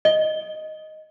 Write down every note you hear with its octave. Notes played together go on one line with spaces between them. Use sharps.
D#5 G7